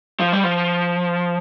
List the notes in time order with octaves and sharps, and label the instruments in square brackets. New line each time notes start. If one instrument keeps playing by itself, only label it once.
[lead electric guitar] F3
G3
F3